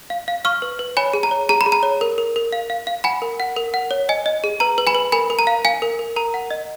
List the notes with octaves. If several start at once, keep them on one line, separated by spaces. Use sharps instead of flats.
F5
F5
F5 C#6 F6
B4
B4
C#5 G#5 B5
G#4
A#5
C#5
G#4 A#5
B5
G#4
A#5
C#5
A#4
A#4
A#4
F5
F5
F5
F#5 G#5 B5
A#4
F#5
A#4
F#5
C#5
D#5 G#5
D#5
G#4
B4 A#5
B4
G#5 B5
B4
A#4 G#5 B5
A#4
A#5
F5
F5 G#5
A#4
A#4
A#4 A#5
F#5
D#5